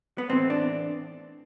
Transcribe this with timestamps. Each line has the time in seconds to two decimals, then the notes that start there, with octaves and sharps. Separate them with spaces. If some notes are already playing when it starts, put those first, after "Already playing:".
0.18 B3
0.29 A2 E3 C4
0.50 D4